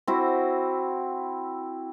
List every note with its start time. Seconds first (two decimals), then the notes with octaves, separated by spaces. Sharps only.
0.07 C4 E4 F#4